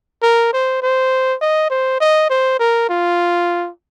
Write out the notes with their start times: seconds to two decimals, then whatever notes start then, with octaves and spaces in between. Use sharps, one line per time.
0.23 A#4
0.53 C5
0.82 C5
1.41 D#5
1.70 C5
2.01 D#5
2.30 C5
2.59 A#4
2.89 F4